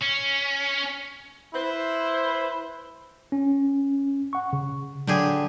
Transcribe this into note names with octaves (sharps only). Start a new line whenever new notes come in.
C#4
E4 B4 C5
C#4
F#5 C#6
C#3
D3 F#3 G4 G#4